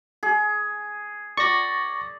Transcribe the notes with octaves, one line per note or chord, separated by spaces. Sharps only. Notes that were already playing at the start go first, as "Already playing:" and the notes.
G#4
D5 C#6 A#6